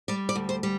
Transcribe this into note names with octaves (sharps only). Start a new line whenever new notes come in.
G3 D5
D5
D2
C5
G3